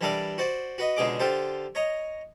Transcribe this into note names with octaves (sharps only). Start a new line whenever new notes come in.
E3 G3 D4 A4 A#4 D5
F#4 C5 D5
F#4 B4 D#5
C#2 B2 D3 G#4 D#5 D6
D3 F4 G4 A4 C5
C#5 D#5 A#5